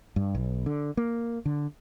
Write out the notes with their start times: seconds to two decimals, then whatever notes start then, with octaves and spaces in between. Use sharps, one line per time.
0.16 G2
0.35 B1
0.66 D3
0.97 A#3
1.46 D3